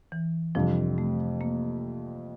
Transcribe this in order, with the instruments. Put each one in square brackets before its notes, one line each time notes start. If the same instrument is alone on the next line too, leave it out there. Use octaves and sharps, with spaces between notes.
[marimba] E3
[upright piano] F2 C3 G3 D4 [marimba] F3
[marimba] A3
A#3